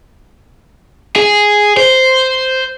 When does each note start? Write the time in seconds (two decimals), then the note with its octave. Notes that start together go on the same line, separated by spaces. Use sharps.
1.16 G#4
1.77 C5